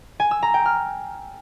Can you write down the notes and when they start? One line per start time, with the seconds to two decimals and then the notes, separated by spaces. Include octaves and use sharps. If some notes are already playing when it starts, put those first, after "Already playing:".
0.20 G#5
0.31 E6
0.43 A#5
0.54 G5
0.65 F6